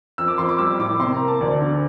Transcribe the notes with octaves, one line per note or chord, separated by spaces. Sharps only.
F2 E6
D6
F2 C6
D6
G3 E6
A2 D6
C3 C6
A#5
A#3
A5
D2 D5
D3